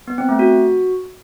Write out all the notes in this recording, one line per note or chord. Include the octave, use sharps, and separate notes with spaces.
B3
C4
A3
F#4